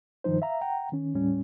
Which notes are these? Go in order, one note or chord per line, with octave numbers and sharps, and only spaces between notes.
G2 D#3 F3 D#4 C5
E5 F5 A#5
F#5 G5 A#5
D#3 C#4
D#2 A2 G3 C#4